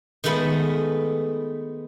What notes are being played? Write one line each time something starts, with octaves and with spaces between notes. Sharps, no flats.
D#3 G#3 A3 B3 B5